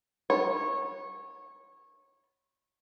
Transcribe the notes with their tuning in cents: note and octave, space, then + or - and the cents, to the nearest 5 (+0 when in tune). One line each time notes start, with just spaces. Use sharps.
C#5 -20